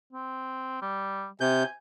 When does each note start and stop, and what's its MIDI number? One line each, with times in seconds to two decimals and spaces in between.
0.13 0.80 60
0.82 1.29 55
1.41 1.63 48
1.41 1.74 80
1.41 1.63 91